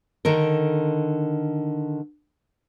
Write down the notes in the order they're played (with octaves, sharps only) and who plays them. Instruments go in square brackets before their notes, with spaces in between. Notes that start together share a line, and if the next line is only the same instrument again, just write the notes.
[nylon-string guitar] D3 D#3 A4 A#4